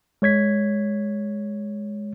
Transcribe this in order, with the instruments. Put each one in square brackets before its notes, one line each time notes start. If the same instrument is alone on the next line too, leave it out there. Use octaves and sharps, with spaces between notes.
[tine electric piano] G#3 C#5 G#6 B6